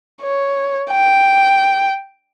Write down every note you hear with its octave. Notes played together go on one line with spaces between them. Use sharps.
C#5
G5